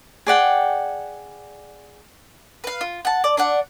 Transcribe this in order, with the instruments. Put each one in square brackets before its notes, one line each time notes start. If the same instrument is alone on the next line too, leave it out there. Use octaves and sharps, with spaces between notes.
[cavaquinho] G#4 D5 F#5 G5
[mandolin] B4 F5
F4
F#5 A5
D5
D4 D5 F#5